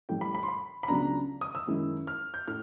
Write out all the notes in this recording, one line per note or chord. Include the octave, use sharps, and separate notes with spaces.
A2 E3 G3 G5
B5
B5
C6
B5
B5
C#2 C#3 F#3 B3 D4 A#5
D#6
E6
F#2 D#3 G#3 C#4 E4
F6
G6
A2 F6